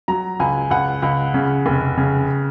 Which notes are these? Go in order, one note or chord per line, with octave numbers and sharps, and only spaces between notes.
F#3 A#5
C#2 G#5
C#2 F#5
C#2
C#3
F1
C#3